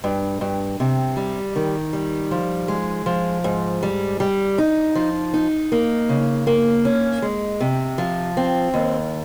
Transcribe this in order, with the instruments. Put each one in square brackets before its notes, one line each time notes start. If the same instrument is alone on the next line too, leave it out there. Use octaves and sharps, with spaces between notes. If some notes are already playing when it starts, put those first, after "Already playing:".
[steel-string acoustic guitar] G2
G2
C3
G3
D#3
G3
F3
G#3
F3
G#2
G3
G3
D#4
F3
D#4
A#3
C#3
A#3
C#4
G#3
C3
F3
C4
D#2